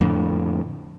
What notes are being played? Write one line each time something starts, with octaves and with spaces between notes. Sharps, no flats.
F2 A2 D3